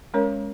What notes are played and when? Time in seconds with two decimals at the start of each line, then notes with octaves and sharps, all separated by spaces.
0.14 G#3 C#4 A#4 C#5